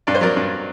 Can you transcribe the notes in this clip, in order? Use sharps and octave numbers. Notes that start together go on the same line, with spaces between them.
G2 D5
C5
F#3 A#4 D5
G2